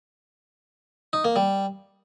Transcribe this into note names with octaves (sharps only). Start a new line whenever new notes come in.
D#4
A#3
G3